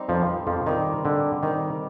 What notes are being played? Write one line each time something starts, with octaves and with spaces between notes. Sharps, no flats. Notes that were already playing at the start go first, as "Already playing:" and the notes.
Already playing: G3 C4 D#4 G4
F2 F3
F2 F3
D#3 G3 C4 D#4 G4
D3
D#3 G3 C4 D#4 G4